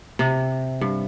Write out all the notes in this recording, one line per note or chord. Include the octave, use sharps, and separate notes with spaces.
C3
G2